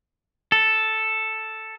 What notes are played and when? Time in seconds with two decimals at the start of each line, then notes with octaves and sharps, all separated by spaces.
0.52 A4